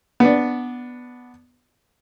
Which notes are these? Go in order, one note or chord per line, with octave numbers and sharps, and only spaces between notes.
B3 D4